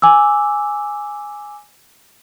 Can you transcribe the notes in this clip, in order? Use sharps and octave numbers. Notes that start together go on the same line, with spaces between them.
G#5 D6 E6